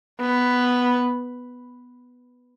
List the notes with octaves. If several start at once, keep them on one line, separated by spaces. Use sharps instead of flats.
B3